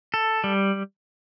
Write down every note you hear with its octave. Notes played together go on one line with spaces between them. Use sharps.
A4
G3